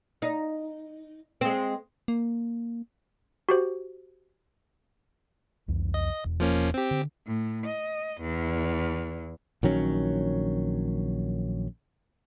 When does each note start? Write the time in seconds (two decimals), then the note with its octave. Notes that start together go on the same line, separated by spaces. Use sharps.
0.22 D#4
1.41 G#3 C4
2.08 A#3
3.49 F#4 G4 C5
5.68 C2 F2 E3
5.94 D#5
6.24 E1 E2
6.40 F3 A#3 C#4
6.74 C4 G4
6.91 D3
7.27 A2
7.66 D#5
8.21 E2
9.63 A#1 D#3 F#3 C#4